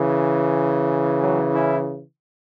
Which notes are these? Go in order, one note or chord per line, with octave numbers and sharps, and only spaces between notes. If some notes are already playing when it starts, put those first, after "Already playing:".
Already playing: C#3 E3
F#3
C#4 E4